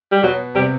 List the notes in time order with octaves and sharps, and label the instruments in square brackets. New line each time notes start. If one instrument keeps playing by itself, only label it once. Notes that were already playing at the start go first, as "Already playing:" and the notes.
[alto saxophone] G3
[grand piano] B2 B3 [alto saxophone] F#3
[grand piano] C3 C4 [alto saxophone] G3